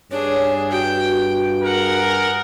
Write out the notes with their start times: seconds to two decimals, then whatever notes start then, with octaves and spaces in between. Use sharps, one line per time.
0.11 G2 D4 G#4 C#5
0.71 F#4 G5
1.63 G#4 A#4 F#5